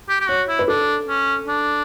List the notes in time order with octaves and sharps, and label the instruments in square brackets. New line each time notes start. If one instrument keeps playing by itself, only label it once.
[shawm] G4
G4
[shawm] F#4 [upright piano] C#5
[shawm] E4
[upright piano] B4
[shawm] D4 [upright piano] A4
[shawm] C#4
D4